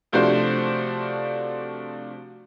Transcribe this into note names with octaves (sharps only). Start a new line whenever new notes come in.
C3 F3 A3 D4 F#4 C5